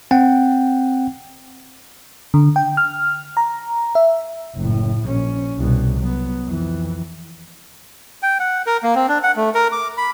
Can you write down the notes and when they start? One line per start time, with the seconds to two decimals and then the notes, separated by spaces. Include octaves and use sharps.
0.11 C4 F#5 G5
2.34 D3
2.56 G5
2.77 F6
3.37 A#5
3.95 E5
4.56 F#1 A2
5.05 A#1 C#4
5.58 C2 B2
5.99 F#3 B3
6.47 F2 E3
8.23 G5
8.40 F#5
8.66 A#4
8.83 A#3
8.95 C4
9.08 D4
9.23 F#5
9.36 A3
9.55 A#4
9.72 D6
9.98 B5